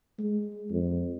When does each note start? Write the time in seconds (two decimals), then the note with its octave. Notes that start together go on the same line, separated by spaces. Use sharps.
0.19 G#3
0.70 F2